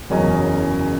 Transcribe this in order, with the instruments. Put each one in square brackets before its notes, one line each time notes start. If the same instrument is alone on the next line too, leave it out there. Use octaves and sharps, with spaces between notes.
[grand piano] F#1 E2 C#3 F#3 C#4 D#5